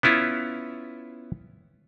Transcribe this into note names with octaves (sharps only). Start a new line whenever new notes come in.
B3 C#4 E4 F4